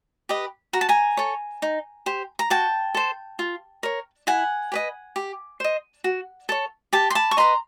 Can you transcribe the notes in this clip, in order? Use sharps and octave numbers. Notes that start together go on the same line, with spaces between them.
G4 B4 D#5
F#4 A#5
A5
G#5 A#5
A4 C#5
D#4
G4 C5
A#5
F#4 G5 A5
A4 C5
F4
A#4 C#5
E4 F#5 G#5
G4 B4 D#5
G4
C5 D#5
F#4
A4 C#5
G4 G5 A5
C6
A5 B5
C#6
B4 D#5 A#5 C6